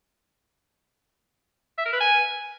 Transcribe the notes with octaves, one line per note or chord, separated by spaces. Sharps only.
E5
A#4
B4
G#5